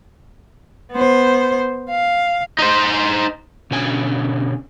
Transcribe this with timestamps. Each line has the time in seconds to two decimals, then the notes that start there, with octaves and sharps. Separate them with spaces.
0.92 B3 C5
1.90 F5
2.59 D#4 C5
3.71 B2 D3 C#4 G#5